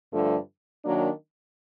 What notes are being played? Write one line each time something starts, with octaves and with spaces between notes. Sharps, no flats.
G2 D3 F3 A3
D#3 F#3 A#3 D4